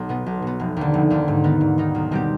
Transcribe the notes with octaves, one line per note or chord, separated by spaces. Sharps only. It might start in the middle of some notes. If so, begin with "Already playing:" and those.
Already playing: B1
B2 B3
B1
B2 B3
F1
D#2 D3
F1
D#2 D3
G#2
D#3 B3 D#4
G#2
D#3 B3 D#4
B1
B2 G3 C4 G4